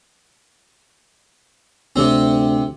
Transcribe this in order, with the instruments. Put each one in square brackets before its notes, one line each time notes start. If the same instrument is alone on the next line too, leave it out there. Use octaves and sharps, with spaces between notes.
[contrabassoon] D2 [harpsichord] C3 C4